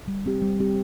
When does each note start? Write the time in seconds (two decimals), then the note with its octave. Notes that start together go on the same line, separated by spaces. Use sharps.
0.08 G3
0.26 C4 G4
0.42 G3
0.60 C4 G4